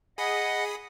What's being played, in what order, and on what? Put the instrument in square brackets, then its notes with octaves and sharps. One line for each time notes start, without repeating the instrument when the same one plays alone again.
[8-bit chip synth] G#4 B5 D#6 [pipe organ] D#5 F#5